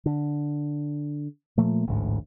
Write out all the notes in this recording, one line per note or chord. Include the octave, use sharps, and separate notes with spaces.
D3
A#2 F3 A3 A#3
A1 D2 G#2